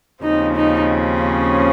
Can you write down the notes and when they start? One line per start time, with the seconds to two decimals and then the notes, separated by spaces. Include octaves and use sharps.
0.23 D#2 C#3 F3 C4 D#4
0.56 D#4
1.23 C#4